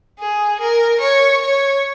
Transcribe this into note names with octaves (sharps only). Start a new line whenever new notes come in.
G#4
A#4
C#5
C#5